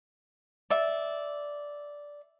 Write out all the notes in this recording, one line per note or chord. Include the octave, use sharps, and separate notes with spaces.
D5 E5